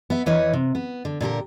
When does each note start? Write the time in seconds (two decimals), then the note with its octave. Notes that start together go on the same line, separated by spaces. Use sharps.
0.10 B3 E5
0.26 E2 E3 B4 C#5 D#5
0.53 C3
0.75 B3
1.05 D3
1.21 A#2 D3 G4 A#4